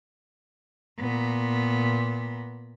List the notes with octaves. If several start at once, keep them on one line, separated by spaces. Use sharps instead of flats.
A#2 B3